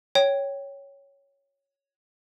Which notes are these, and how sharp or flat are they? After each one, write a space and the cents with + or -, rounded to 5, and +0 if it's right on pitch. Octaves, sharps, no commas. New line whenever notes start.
C#5 +0 G5 +0